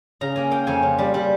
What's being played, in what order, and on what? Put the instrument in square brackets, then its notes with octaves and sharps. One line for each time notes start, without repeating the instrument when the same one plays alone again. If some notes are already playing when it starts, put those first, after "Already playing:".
[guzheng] C#3 A#5
A#3 G#5
A#3 G5
F2 G#5
C#3
G3
G3